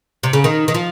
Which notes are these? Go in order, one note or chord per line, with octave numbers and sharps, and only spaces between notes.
C3
C#3
D#3
D#3
F3